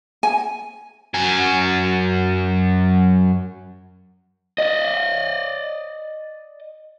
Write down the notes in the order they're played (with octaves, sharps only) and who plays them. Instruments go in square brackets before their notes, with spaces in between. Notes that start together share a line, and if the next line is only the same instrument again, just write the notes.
[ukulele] G#5
[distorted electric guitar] F#2 G#5
[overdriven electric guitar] D5 D#5